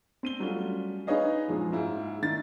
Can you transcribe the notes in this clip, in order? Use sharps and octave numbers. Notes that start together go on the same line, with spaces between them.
C4 D#7 G7
F#3 G3 A3 C#4 F4
D#4 G#4 B4 C#5 D#5 F5
F#2 A#2 F3 G#3
G#2 E4 F4
D#3 E4 A6